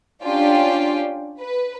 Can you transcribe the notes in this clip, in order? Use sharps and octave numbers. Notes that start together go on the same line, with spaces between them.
C#4 D4 F4 G4 G5
B4